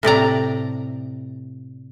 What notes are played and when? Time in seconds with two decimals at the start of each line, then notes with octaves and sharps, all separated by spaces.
0.03 A2 C3 D5 A#5